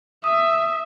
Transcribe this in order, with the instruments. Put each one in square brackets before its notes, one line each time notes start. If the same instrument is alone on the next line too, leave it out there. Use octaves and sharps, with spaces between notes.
[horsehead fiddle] E5 [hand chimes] D#6